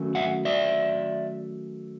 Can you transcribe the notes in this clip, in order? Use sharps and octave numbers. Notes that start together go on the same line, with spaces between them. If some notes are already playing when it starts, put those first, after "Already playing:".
Already playing: D#3 F#3 A3 C#4
E5 F#5
D5 E5